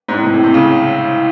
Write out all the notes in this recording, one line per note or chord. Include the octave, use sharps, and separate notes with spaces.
G#2
A2
C3
A2
C3
C#3